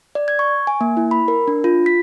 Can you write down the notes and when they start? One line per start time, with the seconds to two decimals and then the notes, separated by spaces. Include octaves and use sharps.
0.15 D5
0.28 G#6
0.39 C#6
0.67 G#5
0.81 A#3
0.97 E4
1.11 B5
1.28 A#4
1.48 D4
1.64 F4
1.86 B6